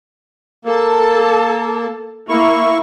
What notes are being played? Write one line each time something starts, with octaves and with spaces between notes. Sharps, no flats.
A#3 A4 A5
A#3 E4 C#6